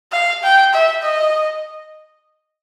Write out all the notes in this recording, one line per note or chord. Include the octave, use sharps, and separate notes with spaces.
F5
G5
E5
D#5